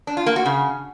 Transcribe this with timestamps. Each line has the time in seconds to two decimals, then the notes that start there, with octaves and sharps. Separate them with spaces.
0.07 D4
0.17 F4
0.26 A#3
0.36 F#4
0.46 C#3